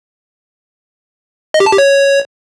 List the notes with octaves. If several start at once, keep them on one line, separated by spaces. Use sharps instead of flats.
D#5
G4
A5
G4
C#5